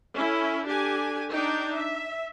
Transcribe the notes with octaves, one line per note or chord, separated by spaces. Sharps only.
C#4 E4 A4
D4 G4 A4 G#5
D4 D#4 G5
E5